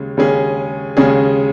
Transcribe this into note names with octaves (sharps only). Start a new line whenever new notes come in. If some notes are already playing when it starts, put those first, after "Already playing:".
Already playing: D#2 C#3 G#3
D#2 C#3 G#3 C#4 G#4
D#2 C#3 G#3 C#4 G#4